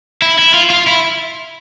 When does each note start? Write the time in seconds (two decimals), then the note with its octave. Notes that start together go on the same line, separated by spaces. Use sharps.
0.22 E4
0.39 E4
0.54 F4
0.70 F4
0.87 E4